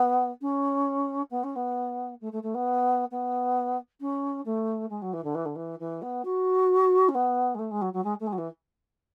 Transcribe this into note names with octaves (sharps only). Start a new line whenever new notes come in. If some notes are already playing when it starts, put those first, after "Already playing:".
Already playing: B3
C#4
B3
C#4
B3
A3
A3
A3
B3
B3
C#4
A3
G#3
F#3
E3
D3
E3
D3
E3
E3
B3
F#4
C#4
B3
G#3
A3
G#3
F#3
F#3
G#3
A3
G#3
F#3
E3